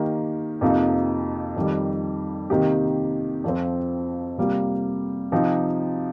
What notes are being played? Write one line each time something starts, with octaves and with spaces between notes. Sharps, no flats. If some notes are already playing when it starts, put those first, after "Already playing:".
Already playing: D#3 A#3 G4
F2 C3 F3 A#3 D#4
F2 D#3 G3
C3 D#3 A#3 D#4 G4
F2 F3 C4
C3 G3 A#3 F4
C3 F3 D#4 G4